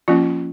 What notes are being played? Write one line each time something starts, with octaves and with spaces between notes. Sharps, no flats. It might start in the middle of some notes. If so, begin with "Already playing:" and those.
F3 A#3 C#4 F4